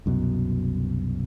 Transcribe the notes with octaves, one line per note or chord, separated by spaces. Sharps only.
C2 F#2 B2